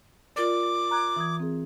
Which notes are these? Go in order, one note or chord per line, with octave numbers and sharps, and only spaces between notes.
F4 A#4 D5 D6
A#5 F#6 G#6
E3 D#6 G#6
C4 G#4